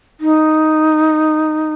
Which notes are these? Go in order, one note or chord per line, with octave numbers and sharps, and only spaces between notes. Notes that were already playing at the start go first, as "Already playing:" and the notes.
D#4